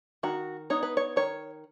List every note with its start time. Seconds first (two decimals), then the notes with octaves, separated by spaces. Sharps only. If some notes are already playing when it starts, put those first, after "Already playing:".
0.23 D#3 F#4
0.70 B3 D#4 C#5
0.83 B4
0.97 C#5
1.16 D#3 C#5